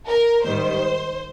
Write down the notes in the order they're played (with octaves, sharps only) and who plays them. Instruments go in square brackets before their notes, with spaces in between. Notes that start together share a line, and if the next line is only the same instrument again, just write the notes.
[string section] A#4
G#2 D#3 G3 C5